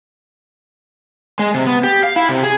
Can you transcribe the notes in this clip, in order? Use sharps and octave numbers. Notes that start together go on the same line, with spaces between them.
G#3
C3
B3
G4
F5
E4
C3
G#4